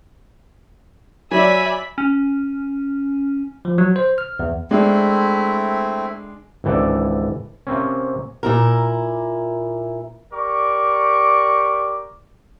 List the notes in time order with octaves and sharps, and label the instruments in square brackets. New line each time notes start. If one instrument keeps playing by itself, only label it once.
[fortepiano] F#3 [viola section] D5 E5 [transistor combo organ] G#5 [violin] B5
[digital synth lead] C#4
[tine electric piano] F3
F#3
C5
F6
E2
[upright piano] G#3 D4 [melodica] A3 C4 E4
[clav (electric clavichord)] G#1 C#2 E3 A4 D5
C3 A#3 C4 C#4
[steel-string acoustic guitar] A#2 E4 A#4
[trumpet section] G4 A#4 D5 C#6 D6